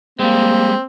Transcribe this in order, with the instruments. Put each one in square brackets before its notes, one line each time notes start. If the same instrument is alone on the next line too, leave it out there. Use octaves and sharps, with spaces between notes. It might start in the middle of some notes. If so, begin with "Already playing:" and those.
[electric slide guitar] G3 G#3 [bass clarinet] A#3 [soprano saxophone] C4